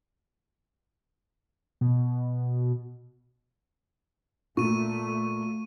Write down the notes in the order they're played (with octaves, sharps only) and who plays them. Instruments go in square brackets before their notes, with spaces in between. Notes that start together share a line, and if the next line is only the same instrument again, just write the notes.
[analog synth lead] B2
[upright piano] A#2 [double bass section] A3 [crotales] C#6 D#7